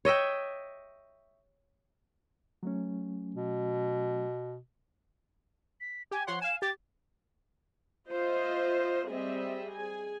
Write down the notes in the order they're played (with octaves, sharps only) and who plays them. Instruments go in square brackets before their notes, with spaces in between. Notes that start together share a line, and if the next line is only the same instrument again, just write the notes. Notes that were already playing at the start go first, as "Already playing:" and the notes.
[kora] C#5 D#5 E5 G5
[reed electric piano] F#3 A3 C#4
[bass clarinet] B2
[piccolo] B6
[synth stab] G4 [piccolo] G#5
[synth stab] F3 C#5 F#5 [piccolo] C6
[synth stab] F5 G#5 [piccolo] E7
[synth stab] G4 [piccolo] A6
[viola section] F4 C5 D#5 E5
G3 C4 G#4 D#5 E5
G#4 G#5